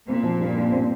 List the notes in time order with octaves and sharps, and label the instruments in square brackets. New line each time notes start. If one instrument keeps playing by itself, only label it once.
[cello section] A#2 [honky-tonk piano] C4
[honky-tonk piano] F3
G2
G2
C4